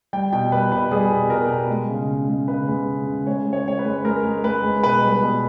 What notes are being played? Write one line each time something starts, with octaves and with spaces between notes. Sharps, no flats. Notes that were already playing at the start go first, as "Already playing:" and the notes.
G3 G5
B2 G5
G3 B4
B2 B4
G3 G#4
B2
B2 A#4
B2
G#3
C#3
C#3
G#3
C#3 B4
G#3
C#3
C#3
G#3 C#5
G#3
C#5
G#3 C#5
B4
G#3
G#3 A#4
G#3
G#3 B4
G#3
B2 B4
G3
B4
B2